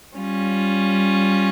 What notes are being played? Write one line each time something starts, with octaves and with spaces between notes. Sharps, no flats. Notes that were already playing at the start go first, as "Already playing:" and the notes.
G3 C#4 F4